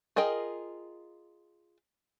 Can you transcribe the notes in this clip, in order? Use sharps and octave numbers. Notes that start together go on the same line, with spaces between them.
F4 G#4 A#4 D#5 G5